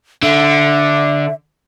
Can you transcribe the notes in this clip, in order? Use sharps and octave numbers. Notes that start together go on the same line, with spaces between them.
D3 E5